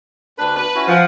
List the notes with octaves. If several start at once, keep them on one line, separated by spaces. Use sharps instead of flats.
D2 D4 B4
B4
C#4 E4 F#4
F3 F#5